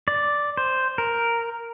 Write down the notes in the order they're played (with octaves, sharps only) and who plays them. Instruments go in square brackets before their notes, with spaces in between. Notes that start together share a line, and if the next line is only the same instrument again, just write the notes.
[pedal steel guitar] D5
C5
A#4